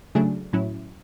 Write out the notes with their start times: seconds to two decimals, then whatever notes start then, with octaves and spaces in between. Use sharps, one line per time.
0.15 C#3 F#3 A3 D4 G#4
0.53 A2 F#3 C#4 E4